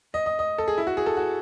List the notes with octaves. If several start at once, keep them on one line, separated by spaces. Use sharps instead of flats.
D#5
D#5
D#5
A4
G#4
E4
F#4
G#4
A4
F#4